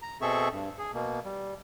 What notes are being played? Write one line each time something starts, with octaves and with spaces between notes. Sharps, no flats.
A#5
B2 C4 G#4 A4 E5 C#6
G2
G#4
B2 A#3
G3